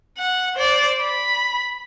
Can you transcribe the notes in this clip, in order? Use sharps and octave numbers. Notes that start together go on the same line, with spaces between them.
F#5
C5 D5
B5